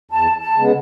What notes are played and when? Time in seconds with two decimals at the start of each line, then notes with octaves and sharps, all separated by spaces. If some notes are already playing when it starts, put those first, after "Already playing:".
0.11 E2 A5
0.41 A5
0.56 C#3 G#3 B3